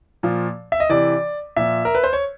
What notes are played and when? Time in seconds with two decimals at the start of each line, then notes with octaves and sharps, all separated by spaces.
0.23 A#2 F3
0.72 E5
0.80 D#5
0.89 C3 E3 D5
1.57 A#2 F3 E5
1.85 A#4
1.95 B4
2.04 C5
2.13 C#5